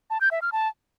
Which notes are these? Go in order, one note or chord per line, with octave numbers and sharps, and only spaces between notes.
A5
G6
E5
F6
A5